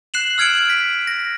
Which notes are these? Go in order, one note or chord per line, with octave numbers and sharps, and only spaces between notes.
F#6 C7 E7 F#7
E6 F6 G#6 C#7 D7 F#7
B6
A#6